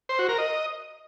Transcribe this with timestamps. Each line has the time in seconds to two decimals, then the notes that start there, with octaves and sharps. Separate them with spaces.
0.09 C5
0.19 F#4
0.29 A#4
0.38 D#5